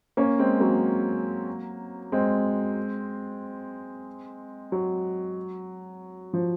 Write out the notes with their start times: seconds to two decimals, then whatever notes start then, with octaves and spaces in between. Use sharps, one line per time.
0.17 A#3 C#4
0.39 G#3 C4
0.60 F#3 A#3
2.12 G#3 C4
4.72 F#3
6.34 F3